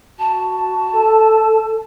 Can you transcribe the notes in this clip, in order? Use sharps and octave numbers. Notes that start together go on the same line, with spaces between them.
F#4 A5
A4